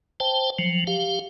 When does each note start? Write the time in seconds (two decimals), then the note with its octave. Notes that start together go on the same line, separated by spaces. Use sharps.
0.20 C5 G5 A5
0.59 F3 F#3
0.87 G4 F5